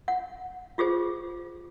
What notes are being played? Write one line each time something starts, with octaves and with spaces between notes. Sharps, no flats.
F#5
F4 G4 G#4 C5